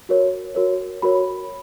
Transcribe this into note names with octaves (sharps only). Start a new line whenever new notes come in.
F#4 A#4 C#5
F#4 A#4 C#5
F#4 A#4 C#5 B5